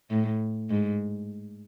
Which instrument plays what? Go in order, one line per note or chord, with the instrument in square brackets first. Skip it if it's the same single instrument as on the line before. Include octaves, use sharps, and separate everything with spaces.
[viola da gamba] A2
G#2